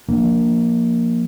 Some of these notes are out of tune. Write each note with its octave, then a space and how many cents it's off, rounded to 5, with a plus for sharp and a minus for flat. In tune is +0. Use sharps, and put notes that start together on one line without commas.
F3 +0 A#3 +0 D4 +0